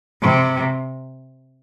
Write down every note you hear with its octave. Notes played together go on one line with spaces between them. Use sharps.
C3